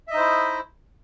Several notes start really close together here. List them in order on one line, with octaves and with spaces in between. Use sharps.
E5 D#5 D#4 C5 E4